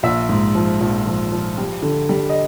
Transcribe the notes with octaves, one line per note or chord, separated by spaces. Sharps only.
A#1 E5
G#2
F3
A#1
F3
F3
G3
D3
G3
D#5